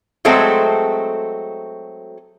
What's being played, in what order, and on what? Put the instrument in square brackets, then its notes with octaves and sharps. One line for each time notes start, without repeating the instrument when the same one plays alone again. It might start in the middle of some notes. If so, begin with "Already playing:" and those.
[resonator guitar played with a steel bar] F#3 G#3 A3 C4 F#4 A4